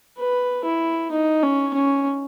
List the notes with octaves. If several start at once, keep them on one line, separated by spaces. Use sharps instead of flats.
B4
E4
D#4
C#4
C#4